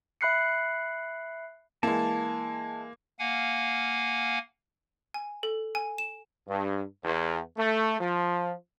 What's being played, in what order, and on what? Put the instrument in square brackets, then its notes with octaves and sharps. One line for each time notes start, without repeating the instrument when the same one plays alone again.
[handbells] E5 B5 F#6 C7 C#7
[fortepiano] E3 G#3 [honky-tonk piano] A#3 [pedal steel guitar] A5
[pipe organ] A#3 F5 F#5 G#5
[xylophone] G#5
A4
G#5
E7
[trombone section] G2
E2
A3
F3